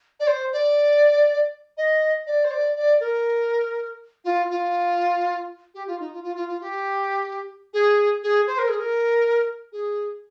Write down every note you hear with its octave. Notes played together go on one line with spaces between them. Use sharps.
D5
C5
D5
D#5
D5
C5
D5
D5
A#4
F4
F4
G4
F4
D#4
F4
F4
F4
F4
G4
G#4
G#4
C5
A#4
G#4
A#4
G#4